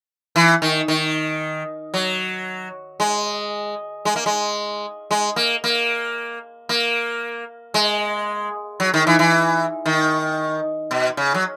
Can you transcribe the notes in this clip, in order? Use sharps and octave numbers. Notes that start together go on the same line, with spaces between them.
E3
D#3
D#3
F#3
G#3
G#3
A#3
G#3
G#3
A#3
A#3
A#3
G#3
F#3
D#3
E3
E3
D#3
B2
C#3
F#3